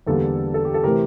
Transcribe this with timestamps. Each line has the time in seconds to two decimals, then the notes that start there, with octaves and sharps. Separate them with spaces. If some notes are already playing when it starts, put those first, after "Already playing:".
0.07 E2 D3 G3 A#3 A4
0.54 A4
0.65 G4
0.74 A4
0.83 C3 E3 A3 C4 G4 A#4